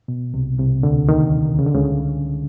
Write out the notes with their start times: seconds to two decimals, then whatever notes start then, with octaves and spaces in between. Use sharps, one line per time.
0.08 B2
0.34 C2 C3
0.59 C2 C3
0.83 D2 D3
1.09 D#2 D#3
1.59 C#3
1.66 D3
1.75 C#2 C#3